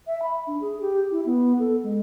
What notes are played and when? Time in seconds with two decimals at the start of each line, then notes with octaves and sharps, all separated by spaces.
0.07 E5
0.23 B5
0.47 D4
0.61 G#4
0.81 G4
1.11 E4
1.26 B3
1.59 A4
1.83 G#3